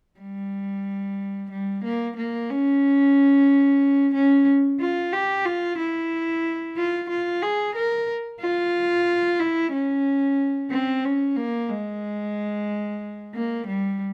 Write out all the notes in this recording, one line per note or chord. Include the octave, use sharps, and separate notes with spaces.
G3
G3
A#3
A#3
C#4
C#4
F4
G4
F4
E4
F4
F4
G#4
A#4
F4
E4
C#4
C4
C#4
A#3
G#3
A#3
G3